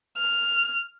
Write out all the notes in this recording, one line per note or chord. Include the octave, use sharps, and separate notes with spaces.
F6